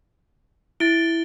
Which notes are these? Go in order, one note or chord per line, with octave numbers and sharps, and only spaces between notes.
E4 A6 D7 G7